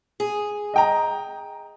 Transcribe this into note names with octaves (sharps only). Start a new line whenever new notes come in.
G#4
D#5 G5 A#5